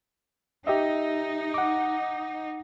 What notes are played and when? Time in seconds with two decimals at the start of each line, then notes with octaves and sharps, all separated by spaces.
0.67 D#4 G4 D#5 E5
1.54 F#5 D6